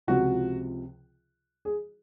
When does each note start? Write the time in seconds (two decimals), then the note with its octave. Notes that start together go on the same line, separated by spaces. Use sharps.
0.07 C#2 C3 F3 F#4
1.65 G#4